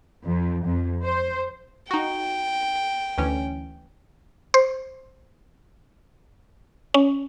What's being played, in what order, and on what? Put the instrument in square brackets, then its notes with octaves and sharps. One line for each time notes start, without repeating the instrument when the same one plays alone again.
[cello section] F2
F2
C5
[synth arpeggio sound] D#4 F#4 [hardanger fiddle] G5
[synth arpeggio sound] D2 E3 C#4
C5
C#4